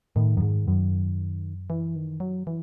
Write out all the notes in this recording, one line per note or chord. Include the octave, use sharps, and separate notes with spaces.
A2 D#3
F#2
G#2
F#2
E3
D#3
F#3
E3